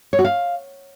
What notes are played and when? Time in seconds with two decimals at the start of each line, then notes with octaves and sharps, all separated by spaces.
0.13 C#5
0.19 F#4
0.25 F5